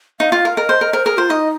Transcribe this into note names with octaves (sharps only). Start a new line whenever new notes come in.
D#4 F5
F4
A#4
A#4 D#5
C5
A#4
A#4 C5
G#4 A#4
F4 C5
D#4 D#5